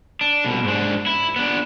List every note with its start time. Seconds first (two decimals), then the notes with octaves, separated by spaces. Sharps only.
0.21 D4
0.45 C2 B2
0.64 G#2 D4
1.07 E4
1.36 B3 D4